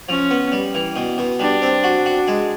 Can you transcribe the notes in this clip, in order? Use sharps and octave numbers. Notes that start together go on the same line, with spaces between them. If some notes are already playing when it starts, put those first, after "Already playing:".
F3 C#4
B3
G3
E3
B2
B2
G3 D4
C4
F#4
F#4
G#3